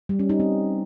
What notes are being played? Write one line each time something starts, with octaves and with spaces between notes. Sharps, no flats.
G3
C#4
D#4
C4